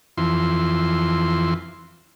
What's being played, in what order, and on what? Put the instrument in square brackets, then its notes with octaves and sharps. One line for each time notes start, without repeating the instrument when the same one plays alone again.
[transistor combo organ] F2 E3 C6